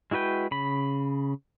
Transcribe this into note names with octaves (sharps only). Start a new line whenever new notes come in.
G#3 E4 F#4 B4 G5
C#3 B5